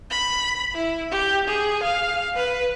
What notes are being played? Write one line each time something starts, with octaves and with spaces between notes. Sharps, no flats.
B5
E4
G4
G#4
F5
B4